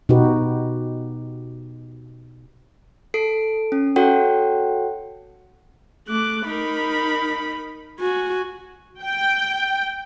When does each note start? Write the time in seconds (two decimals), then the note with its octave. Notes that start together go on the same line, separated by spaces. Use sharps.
0.09 B2 D#4 F#4 G4 B4
3.14 A4 C7 D7
3.72 C#4
3.96 F#4 A4 C#5 F#5 G5
6.08 A3 D6 F#6
6.48 D#4 A#4 B5
8.00 F#4 G#5
9.03 G5